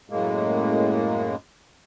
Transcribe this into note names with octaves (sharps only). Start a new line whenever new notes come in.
F#2 A2 G#3 A#3